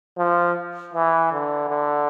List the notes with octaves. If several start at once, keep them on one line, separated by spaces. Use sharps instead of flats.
F3
E3
D3
D3